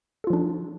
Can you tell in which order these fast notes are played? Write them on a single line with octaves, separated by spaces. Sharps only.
A4 F4 F3 D4 D#4